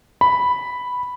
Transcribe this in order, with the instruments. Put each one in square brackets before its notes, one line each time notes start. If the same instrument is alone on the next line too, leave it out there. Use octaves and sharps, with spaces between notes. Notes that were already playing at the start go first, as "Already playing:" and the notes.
[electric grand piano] B5